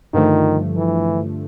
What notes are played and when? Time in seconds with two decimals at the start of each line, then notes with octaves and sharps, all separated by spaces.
0.14 G2 D3 D#3 F3 A3
0.76 E3